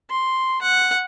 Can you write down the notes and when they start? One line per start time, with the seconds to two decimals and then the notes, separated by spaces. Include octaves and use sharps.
0.10 C6
0.62 F#5